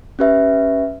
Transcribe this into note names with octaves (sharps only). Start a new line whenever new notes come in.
C#4 G4 B4 E5